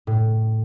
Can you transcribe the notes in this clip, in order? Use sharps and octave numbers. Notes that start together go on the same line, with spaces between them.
A2